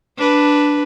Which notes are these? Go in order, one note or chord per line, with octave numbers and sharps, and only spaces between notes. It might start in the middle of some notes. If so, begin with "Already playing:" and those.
D4 B4